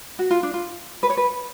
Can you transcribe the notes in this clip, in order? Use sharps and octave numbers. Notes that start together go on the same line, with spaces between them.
F#4
F4
D4
F4
B4
C#5
B4